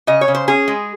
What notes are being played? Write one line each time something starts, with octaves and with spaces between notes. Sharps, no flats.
C#3 D#5
C#5
C#3
C5
C#4 G#4
G#3